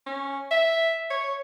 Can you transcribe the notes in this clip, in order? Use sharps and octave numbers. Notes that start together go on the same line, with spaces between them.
C#4
E5
C#5